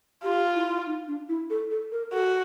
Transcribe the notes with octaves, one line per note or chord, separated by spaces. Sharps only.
F4 G4
E4
D#4
D4
E4
A4
A4
A#4
F#4 A4